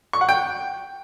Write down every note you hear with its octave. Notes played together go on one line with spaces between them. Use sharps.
C#6
F#5
G5